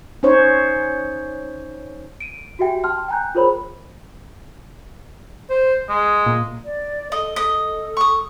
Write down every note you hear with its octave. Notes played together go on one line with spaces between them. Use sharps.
C#4 D#4 C5 C#5
D7 D#7
F#4 G4 E5 G5 G#5
G5 A5 C6 F6
G5 G#5 A#5 F#6 G6
F4 G#4 A#4 C5 C#5 B5
C5
G#3
A#2
D5
A4 D#5
A4 D#5
C#6 D#6